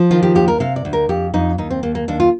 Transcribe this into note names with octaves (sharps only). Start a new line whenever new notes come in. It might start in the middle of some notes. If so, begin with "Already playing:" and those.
Already playing: F3
D#3 F4
G4
D#2 G4
A#4
C3 F5
D5
D2
A#4
F2 G4
F2 D#4
D#2 D#4
C4
D#2 A#3
A#3
D#2 D4
F4